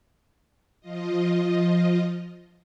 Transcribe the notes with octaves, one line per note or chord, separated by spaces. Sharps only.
F3 F4 D#5